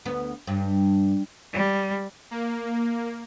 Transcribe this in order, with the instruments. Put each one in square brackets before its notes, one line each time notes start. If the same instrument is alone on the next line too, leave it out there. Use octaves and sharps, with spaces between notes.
[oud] D2 B3
G2
[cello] G3
[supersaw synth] A#3